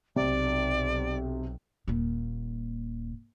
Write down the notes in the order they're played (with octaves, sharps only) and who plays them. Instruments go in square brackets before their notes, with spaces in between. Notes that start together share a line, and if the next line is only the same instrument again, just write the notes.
[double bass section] B1 [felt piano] C3 [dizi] D5
[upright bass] D#1 A#2